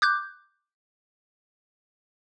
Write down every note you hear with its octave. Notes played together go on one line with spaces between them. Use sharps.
D6 F#6 G6